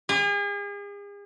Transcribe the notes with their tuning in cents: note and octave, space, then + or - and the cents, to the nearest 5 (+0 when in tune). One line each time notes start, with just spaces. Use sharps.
G#4 -40